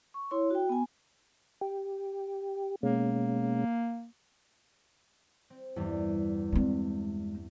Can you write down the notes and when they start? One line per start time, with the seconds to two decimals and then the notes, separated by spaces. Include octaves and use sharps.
0.14 C#6
0.31 E4 C#5 C6
0.50 F#4 G5
0.69 B3 G#5
1.61 G4
2.83 B2 G#3 A#3 C#4
5.50 C4
5.76 E2 G2 G3
6.52 G2 G#3 C4